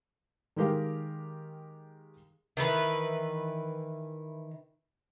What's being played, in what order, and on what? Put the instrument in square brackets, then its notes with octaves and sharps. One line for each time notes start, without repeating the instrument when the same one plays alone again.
[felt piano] D#3 G#3 G4 A#4 F5
[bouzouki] D#3 E3 B4